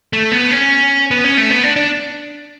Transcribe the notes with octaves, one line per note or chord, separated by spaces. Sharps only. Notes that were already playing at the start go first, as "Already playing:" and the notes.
A3
B3
C#4
B3
C#4
A3
B3
D4
D4